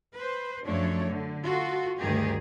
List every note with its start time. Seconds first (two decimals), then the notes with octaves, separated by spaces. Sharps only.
0.16 B4 C5
0.65 F#2 F3 A3 D4 C#5
1.09 D3
1.42 F4 F#4 A4
1.98 D2 G2 D#3 G4 G#4